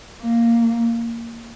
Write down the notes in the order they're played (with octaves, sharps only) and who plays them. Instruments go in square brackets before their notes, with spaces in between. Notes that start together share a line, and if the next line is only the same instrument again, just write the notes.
[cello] A#3